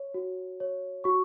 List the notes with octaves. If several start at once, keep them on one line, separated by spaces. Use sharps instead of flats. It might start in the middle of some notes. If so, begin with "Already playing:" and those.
Already playing: C#5
F#4
C#5
F#4 C#6